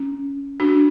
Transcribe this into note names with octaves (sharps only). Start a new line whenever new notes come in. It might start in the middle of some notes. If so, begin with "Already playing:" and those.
Already playing: C#4
D4 F#4